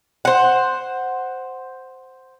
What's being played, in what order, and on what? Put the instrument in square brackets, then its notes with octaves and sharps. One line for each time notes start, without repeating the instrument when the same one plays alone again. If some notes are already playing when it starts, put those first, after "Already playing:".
[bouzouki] C5 F#5